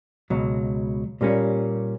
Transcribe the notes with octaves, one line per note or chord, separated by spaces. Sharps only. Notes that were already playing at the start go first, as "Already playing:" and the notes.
C#2 B2 F#3
A#2 G3 A#3 C#4